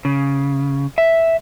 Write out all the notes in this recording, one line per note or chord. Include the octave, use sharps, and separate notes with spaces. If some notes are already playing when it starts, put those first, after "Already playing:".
C#3
E5